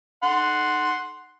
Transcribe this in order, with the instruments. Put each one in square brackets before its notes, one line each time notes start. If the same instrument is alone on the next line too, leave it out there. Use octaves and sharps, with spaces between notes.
[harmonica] F#5 C6